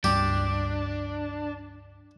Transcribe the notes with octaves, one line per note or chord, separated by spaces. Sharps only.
C#2 G2 G3 D4 G4